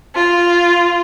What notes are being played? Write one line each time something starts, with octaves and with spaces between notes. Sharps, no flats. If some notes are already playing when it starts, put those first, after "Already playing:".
F4